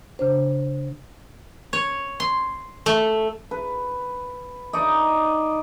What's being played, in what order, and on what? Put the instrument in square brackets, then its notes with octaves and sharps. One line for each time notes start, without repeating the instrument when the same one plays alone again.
[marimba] C#3 D4 C5
[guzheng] C#5
C6
A3
[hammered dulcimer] B4
D#4 D5 D#5